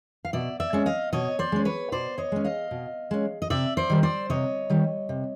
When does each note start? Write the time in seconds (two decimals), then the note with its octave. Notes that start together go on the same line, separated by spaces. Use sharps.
0.25 F5
0.33 B2 D5 E5
0.60 D5 E5
0.73 G#3 C#4
0.86 D#5 F5
1.12 B2 C#5 D#5
1.39 C5 D5
1.52 G#3 C#4
1.65 B4 C#5
1.92 B2 C5 D5
2.18 C#5 D#5
2.32 G#3 C#4
2.44 D#5 F5
2.71 B2
3.11 G#3 C#4
3.42 D#5
3.50 C3 D5 E5
3.77 C5 D5
3.90 D#3 G3
4.03 C5 D5
4.30 C3 C#5 D#5
4.70 D#3 G3
5.09 C3